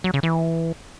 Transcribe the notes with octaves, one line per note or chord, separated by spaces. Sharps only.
F#3
C#3
E3